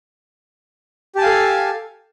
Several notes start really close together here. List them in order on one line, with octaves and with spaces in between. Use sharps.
G4 A5 G#5 F5 A4